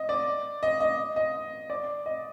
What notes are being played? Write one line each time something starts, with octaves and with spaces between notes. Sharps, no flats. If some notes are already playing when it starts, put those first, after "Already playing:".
Already playing: D#5
D5
D#5
D#5
D#5
D5
D#5